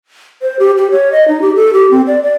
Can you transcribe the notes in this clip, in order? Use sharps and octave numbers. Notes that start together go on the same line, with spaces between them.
C5
G4
G4
C#5
D#5
D#4
G4
A4
G4
C4
D5
D5